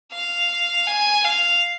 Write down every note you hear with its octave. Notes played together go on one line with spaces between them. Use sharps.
F5
G#5
F5